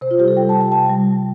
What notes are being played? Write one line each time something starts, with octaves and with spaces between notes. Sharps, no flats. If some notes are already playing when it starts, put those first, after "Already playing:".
C3 C5
F4
G3 G4
A4
G3 G5
A5
C3
G5
C3 A5
G3
G3